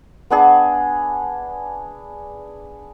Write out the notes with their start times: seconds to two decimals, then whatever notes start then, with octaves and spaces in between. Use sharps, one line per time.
0.30 B3 D4 G#4